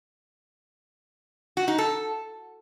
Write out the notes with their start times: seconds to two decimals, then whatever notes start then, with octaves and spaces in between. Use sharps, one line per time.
1.57 F#4
1.68 D#4
1.78 A4